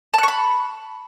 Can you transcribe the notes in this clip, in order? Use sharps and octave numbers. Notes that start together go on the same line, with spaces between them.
A5 B5 C#6 F#6